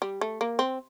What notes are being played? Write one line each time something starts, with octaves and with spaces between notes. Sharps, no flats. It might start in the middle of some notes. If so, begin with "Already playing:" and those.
G3
A3
A#3
C4